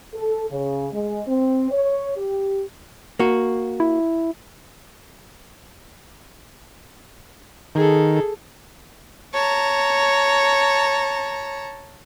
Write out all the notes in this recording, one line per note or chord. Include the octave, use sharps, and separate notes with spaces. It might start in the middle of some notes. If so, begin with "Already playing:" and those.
A4
C#3
G#3
C4
C#5
G4
A#3 F#4
E4
D#3 G#4 A4
C#5 A5 A#5